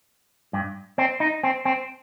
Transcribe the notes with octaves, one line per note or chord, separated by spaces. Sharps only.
G2
C4
D#4
C4
C4